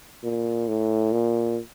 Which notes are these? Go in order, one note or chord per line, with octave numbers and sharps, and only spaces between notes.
A#2
A2
A#2